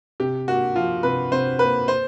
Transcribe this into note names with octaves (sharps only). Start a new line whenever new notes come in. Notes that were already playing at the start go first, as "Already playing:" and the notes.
C3 G4
A#3 F#4
F3 F4
C3 B4
C3 C5
A#3 B4
C5